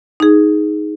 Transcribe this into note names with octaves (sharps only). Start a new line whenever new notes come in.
D#4 G#4